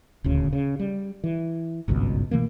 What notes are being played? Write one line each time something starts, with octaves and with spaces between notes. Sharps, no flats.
D#1 D2 C#3
C#3
G3
E3
G#1 C#2 G2 B2
B2 E3 A3 A#3